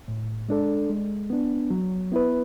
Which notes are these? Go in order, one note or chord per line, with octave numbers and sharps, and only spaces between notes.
A2
G#3 D4 A4 D5
G#3
B3 D4
F#3
B3 E4 B4